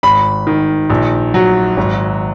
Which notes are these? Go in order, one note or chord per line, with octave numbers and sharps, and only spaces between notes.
G#1 B5
D#3
A#1
F#3
G#1